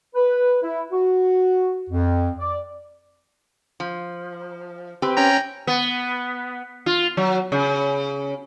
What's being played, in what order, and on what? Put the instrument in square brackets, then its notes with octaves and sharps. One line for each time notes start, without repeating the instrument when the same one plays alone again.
[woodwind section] B4
E4
F#4
F2
D5
[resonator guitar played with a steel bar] F3
C4 G4 B4
[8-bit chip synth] C#4 G5 A#5
[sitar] B3
F4
F#3
C#3